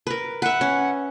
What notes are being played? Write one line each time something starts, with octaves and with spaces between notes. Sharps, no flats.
A#4 B4
B4 E5 F#5
C#4